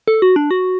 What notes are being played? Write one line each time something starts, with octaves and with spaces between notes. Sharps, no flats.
A4
F#4
D4
F#4